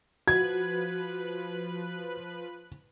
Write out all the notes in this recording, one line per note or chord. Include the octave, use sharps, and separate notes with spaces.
F3 F#4 B4 F#6 G#6